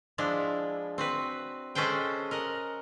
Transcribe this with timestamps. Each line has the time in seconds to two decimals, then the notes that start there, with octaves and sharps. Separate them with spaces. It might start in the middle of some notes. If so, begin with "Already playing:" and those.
0.18 F3 G#3 D4 E4
0.98 C4 F#4 B4
1.75 G#3 C#4 A4 B4 C5 G5
2.31 A#4 D#5 F#5